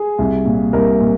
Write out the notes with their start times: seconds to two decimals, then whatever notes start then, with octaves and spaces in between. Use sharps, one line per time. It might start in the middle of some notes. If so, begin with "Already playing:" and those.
Already playing: G#4
0.19 C2
0.46 A#2
0.73 C2 A#4
1.00 A#2